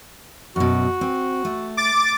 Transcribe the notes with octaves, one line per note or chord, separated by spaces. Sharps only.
F#2 B2 F#4
C4
A3
D6 A6